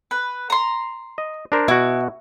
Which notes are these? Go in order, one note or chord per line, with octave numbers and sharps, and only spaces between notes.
B4
A#5 C6
D#5
D4 A#4 C5
B2 E4 F#4